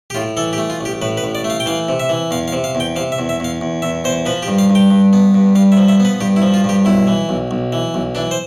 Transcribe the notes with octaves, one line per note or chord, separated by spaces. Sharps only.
G4
A2 F4
E3 A4
G4
A3
F4
A1 G4
A2 B4
B4
A1
D5
A3
F5
G5
E3 F5
C3
E5
E3
E2 F5
F5
C3
F5
E2
G5
C3 F5
E5
E2
E5
E2 F5
E2
E2 E5
E2 C5
F3 B4
G4
G2
F5
G2
G5
G2
B3
G2
G2 F5
E5
F3
E5
B3
B4
G2 G4
E4
F3
F4
G2 G4
B1 E4
E3
B1
B1
E3
B1
E3 D4
C5